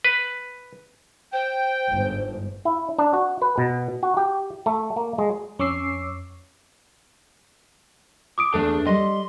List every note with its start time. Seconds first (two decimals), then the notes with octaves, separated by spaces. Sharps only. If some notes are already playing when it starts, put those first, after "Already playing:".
0.04 B4
1.33 C5 G5
1.90 G1 G#2
2.65 E4
2.99 D4
3.14 F#4
3.42 B4
3.58 B2
4.03 F#4
4.17 G4
4.66 A3
4.96 A#3
5.18 G#3
5.59 F2 C#4 C#6 D6 E6 C7
8.38 D6 D#6 D7
8.54 E2 A3 D4 G#4 A4
8.86 G3 D#5 C6